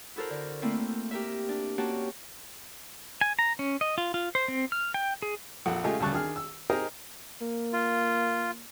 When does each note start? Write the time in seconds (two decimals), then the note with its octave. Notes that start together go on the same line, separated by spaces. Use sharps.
0.16 E4 F#4 A4 A#4 C5
0.30 D3
0.62 A3 A#3 C4 E4
1.11 G4 A#4 E5
1.49 D4
1.78 A#3 C#4 F#4 G4 A5
3.21 G#5
3.39 A#5
3.59 C#4
3.81 D#5
3.98 F4
4.14 F4
4.35 C5
4.48 C4
4.72 F6
4.94 G5
5.22 G#4
5.66 A#1 F2 A4 F#5
5.84 C#3 G#3 A3 F4 G4 G#4
6.00 D2 C#3 G3 A5 C#6 F#6
6.12 D#3 D4 G#4 F6
6.36 E6
6.70 D#4 G4 G#4 A#4 C5 D#5
7.41 A#3
7.73 F4